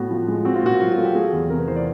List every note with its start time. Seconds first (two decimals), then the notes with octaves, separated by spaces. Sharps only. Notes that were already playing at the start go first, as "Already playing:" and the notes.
Already playing: A2 B3 F#4
0.10 F3
0.28 G#3
0.45 C4 F#4
0.55 F4
0.63 A#2 F#4
0.80 F#3 F4
0.92 F#4
0.97 A3
1.03 G4
1.15 A3 G#4
1.33 E2
1.49 C3 A#4
1.59 B4
1.68 E3 C5
1.76 D5